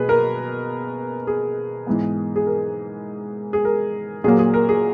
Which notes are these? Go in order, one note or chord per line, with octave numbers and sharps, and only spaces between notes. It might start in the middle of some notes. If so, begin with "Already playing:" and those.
Already playing: B2 A#3 G#4 B4
A#4
G#4
G#2 E3 B3
G#4
A#4
G#4
A#4
A#2 F#3 A#3 G#4
G#4
A#4
G#4